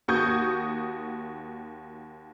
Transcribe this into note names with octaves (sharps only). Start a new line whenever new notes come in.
D#2 F#4 C#6 D#6 G6 G#6